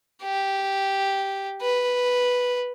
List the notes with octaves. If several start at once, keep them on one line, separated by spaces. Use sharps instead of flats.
G4
B4